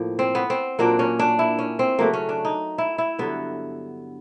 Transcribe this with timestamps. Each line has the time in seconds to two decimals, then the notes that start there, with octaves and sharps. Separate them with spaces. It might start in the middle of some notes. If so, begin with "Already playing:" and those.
Already playing: A2 F3 A#3
0.19 C4
0.35 B3
0.50 C4
0.79 A#2 F#3 A#3 D4
0.99 C#4
1.19 D4
1.39 E4
1.59 C#4
1.79 C4
1.99 C#3 F#3 A3 A#3
2.13 C#4
2.29 D4
2.45 D#4
2.78 E4
2.98 E4
3.18 G2 D3 F#3 B3